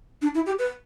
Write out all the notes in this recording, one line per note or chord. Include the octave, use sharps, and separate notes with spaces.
D4
E4
G4
B4